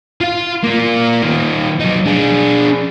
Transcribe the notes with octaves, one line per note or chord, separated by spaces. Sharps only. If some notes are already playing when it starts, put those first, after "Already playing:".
F4 F5
A#3 F4
D#3 F4
F#3 D#4
D4 G#4